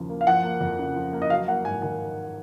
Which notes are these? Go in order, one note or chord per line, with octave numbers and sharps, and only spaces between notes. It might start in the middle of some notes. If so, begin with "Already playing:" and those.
Already playing: D#2 C#3 F3
A#3
F5
F3 F#5
A#3
F2
C#3
F3
A#3
D#5
F#3 F5
A#3 F#5
G#2 G#5
D#3 G#5